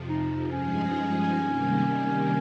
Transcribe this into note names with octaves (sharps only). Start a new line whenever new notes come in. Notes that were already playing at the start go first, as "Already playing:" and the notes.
Already playing: F2 C3 F3
D#4
G2 F3 G#3 C#4 D#4 G#4
C3 D#3 G3 A#3